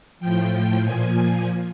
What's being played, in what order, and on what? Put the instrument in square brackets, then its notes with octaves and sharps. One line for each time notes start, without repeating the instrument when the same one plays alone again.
[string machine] A2 F3 G5
A#2 F3 G#5